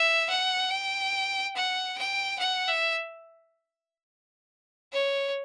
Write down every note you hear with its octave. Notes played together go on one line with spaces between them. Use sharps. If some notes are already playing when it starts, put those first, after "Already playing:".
Already playing: E5
F#5
G5
F#5
G5
F#5
E5
C#5